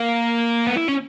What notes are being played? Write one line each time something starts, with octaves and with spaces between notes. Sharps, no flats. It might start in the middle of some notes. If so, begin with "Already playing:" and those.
Already playing: A#3
B3
E4
C#4